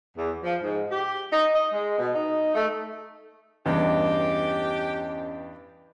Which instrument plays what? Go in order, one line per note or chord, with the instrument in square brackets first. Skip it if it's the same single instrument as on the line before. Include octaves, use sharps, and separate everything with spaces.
[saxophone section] E2
F3
G#2
G4
D#4
D#5
G#3
B2
D#4
A3
[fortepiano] E2 G2 [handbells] C#4 D#5 [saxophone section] G4